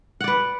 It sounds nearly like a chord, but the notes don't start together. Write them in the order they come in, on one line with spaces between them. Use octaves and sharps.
F#5 D5 B4